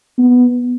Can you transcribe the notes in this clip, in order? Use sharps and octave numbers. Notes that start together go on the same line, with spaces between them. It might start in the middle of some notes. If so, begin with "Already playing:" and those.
B3